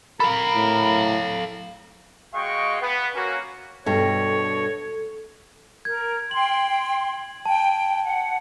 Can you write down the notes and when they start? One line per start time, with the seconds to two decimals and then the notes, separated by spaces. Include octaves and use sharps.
0.20 A4 A#4 F5 B5
0.55 A2
2.34 G#3 F#4 D#5 F5 G5 C#6
2.82 B3
3.15 A#3 C#4 F#4
3.86 G2 B2 A4 C#5
5.85 A#4 G#6
6.31 G5 C6 F#7
7.46 G5 A5
8.04 F#5